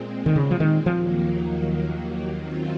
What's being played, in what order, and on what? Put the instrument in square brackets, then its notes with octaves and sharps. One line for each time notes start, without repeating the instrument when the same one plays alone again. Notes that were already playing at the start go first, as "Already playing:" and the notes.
Already playing: [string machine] A#2 G#3 C4
[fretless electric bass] D#3
C#3
F3
D#3
[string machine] D#2 D#3 F#3 A#3 [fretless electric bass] F3
[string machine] F#2 D#3 F#3 C4 F4